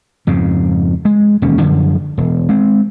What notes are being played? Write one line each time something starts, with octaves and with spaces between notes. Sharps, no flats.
F2 G#2 C#3
G#3
E1 D#2 B2 C#4
F#2 D3 F3
E1
G#3 C4